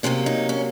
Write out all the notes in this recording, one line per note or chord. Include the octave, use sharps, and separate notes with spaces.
C3 F#3 A#3 C#4
D#4
C#4